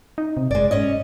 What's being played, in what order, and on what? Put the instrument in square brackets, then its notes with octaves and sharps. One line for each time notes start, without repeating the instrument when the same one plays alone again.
[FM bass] D#4
C3
[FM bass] F#1 [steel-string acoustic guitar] G#3 D5
[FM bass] G#2 [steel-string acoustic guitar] C#4 C#5 D#5